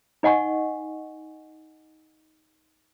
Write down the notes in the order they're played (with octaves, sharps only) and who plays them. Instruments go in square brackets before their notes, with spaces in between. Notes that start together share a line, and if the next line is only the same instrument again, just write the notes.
[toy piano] D#4 D#5 F#5 G#5 C#6